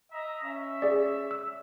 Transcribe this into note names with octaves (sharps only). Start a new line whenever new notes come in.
D#5 E5 A#5
C#4 E5
G#4 D5
E6